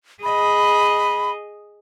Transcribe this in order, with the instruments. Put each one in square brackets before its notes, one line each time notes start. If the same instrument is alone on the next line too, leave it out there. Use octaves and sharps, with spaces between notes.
[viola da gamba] G#4 D#5 [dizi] B5